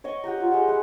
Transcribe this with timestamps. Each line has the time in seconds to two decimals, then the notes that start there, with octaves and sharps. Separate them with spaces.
0.04 C#5 D#5 C#6 D6
0.24 G4 F#5 G5 A#5
0.37 F4 A#5
0.51 G#3 G4 D#5 F#5
0.68 G#3 E4 F#5